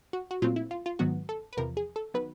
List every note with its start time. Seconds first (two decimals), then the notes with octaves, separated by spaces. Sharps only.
0.13 F#4
0.31 F#4
0.42 A#2 F#3 A3 C4 F4
0.56 E4
0.71 F4
0.86 F4
0.99 G#2 D#3 F#3 B3 F#4
1.29 A4
1.53 B4
1.57 E2 C3 F3 A#4
1.77 G#4
1.96 A4
2.14 D#3 F#3 B3 B4